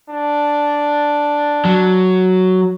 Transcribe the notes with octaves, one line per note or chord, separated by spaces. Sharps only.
D4
F#3